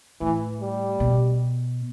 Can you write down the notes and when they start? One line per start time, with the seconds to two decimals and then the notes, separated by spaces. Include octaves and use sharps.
0.21 A2 E3
0.61 G3
1.00 B2